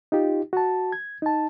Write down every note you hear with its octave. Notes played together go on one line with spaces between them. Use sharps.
D#4 F4 G4
F#4 A5
G#6
D#4 A5